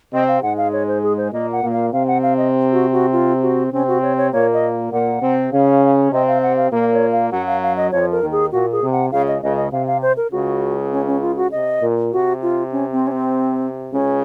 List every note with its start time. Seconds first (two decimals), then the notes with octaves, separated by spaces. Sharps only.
0.13 C3 C4 D#5
0.28 F5
0.42 G#2 G#3 F#5
0.58 F5
0.73 C#5
0.88 C5
1.03 G#4
1.18 C5
1.32 A#2 A#3 D#5
1.52 F#5
1.62 A#2 A#3
1.72 F5
1.92 C3 C4 F5
2.08 F#5
2.23 F5
2.37 D#5
2.73 F#4
2.92 F#4
3.12 F4
3.43 F#4
3.72 C3 C4 C#4
3.88 F#4
4.02 C#5
4.17 C#5
4.33 A#2 A#3 C#5
4.53 D#5
4.92 A#2 A#3 F#5
5.22 C3 C4
5.52 C#3 C#4 F5
6.12 C3 C4 D#5
6.28 F5
6.43 F#5
6.57 F5
6.72 A#2 A#3 F5
6.93 C#5
7.12 F5
7.32 F#2 F#3 F#5
7.47 F5
7.63 F5
7.77 D#5
7.92 F2 F3 C#5
8.12 A#4
8.22 D#2 D#3
8.32 G#4
8.52 A#2 F#4
8.72 G#4
8.83 C3
8.92 F#5
9.12 C#2 C#3 F5
9.28 D#5
9.43 C#2 C#3 D#5
9.57 D#5
9.72 C3 F5
9.87 F5
10.02 C5
10.17 A#4
10.32 C#2 C#3 F#4
10.92 C#4
11.07 C#4
11.22 F4
11.37 F#4
11.52 C3 D#5
11.81 A#2
12.12 C3 F#4
12.42 F4
12.72 C#4
12.92 C4
13.07 C#4
13.12 C4
13.92 C#2 C#3 C#4